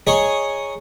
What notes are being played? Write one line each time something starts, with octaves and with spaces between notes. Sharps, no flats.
G#4 C#5 D#5 G#5 A#5 C#6